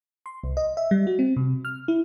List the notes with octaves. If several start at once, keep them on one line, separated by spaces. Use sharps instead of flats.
C6
C2
D#5
E5
G3
F#4
C4
C3
F6
E4